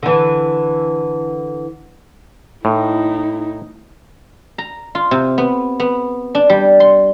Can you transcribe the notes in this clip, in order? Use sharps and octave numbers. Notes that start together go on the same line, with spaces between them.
D3 E3
A2 D#4 E4
A#5
F4
C3
B3
B3
D4
G3
C6